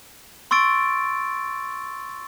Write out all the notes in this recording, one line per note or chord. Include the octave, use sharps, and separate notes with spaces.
C6 C#6 E6 A6 D7